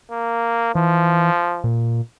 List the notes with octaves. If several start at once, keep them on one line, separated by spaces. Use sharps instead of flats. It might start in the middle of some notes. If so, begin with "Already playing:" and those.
A#3
E3 F3
A#2